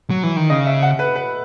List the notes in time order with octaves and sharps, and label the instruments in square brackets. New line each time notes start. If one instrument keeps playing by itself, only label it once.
[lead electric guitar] F#3
E3
D#3
[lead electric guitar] C#3 [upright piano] D#5
[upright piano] E5
F#5
B4
B4